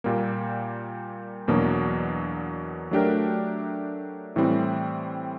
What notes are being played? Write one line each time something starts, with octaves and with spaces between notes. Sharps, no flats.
A#2 G3 A#3
E2 B2 F#3 A#3 D4
F#3 A3 D4 G4 A#4
A2 E3 G3 C4